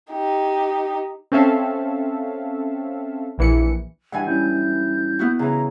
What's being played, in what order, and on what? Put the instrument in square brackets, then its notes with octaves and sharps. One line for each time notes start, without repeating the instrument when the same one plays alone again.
[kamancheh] D#4 G4
[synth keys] C4 C#4 A4 E5 F5
A#1 E3 C#7
[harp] G2 E3 G#5 [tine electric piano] F#5
[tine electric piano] G3 C#4 E4 [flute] G6
[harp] B3 E4 F#4
[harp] C#3 E3 [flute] A#5